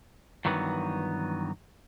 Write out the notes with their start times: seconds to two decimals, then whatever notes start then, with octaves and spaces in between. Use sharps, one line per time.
0.45 G2 D#3 E3 F#3 B3